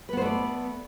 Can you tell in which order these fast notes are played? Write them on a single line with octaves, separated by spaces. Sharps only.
B4 B3 C5 A3 D5